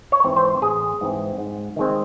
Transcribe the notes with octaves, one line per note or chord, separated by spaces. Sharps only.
C#5
G#2 E3 C4
C5
A1 G#4
G#2 E3 C4
G#2
D#3 G#3 C4